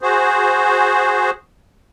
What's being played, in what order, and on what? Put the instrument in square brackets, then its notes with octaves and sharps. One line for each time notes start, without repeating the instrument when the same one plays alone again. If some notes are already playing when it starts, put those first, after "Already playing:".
[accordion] F#4 G#4 C5